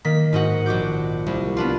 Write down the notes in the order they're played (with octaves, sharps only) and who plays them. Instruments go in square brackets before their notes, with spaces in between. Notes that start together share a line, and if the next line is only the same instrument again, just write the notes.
[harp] D#3 A#3 B6
G#2 D#4 F#4 F#5
A#1 F#4 D6 G6
C2
B3 D4 F4